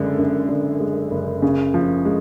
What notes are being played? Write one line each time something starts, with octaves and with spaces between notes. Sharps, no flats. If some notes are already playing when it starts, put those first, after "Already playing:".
Already playing: F#1 F#2 D3 G#3
F#2
D3
G#3
F#1
C#3
F3
G#3